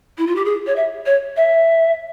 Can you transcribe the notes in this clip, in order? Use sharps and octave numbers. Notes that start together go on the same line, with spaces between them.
E4
F4
G4
G#4
C#5
E5
C#5
E5